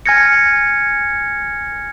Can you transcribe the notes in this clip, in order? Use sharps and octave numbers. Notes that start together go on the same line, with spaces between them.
G#5 F6 G#6 A#6 C#7